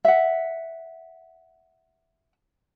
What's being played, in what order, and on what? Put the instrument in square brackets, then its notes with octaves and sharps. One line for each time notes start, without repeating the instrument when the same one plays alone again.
[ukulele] E5 F#5